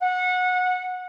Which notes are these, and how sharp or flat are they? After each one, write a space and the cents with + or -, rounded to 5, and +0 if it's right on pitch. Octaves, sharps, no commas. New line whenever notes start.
F#5 -20